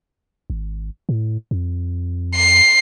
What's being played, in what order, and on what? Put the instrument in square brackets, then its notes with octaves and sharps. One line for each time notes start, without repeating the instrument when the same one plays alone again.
[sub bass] G#1
A2
F2
[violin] C7